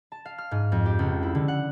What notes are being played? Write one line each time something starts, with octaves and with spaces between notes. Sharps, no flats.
A5
F5
F6
G#2
F2
G4
C#2
E4
D3
F#5